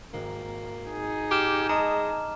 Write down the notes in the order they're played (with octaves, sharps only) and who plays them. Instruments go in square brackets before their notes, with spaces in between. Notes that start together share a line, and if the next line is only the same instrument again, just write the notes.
[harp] G#1 [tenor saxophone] A#3
[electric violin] D#4 G#4
[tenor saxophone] G4 [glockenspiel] D6 F6 E7
[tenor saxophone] G#3 [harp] D#5 A5 F#6 [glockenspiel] A#5